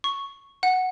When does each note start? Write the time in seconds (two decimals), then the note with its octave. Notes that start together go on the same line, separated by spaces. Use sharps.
0.04 C#6
0.63 F#5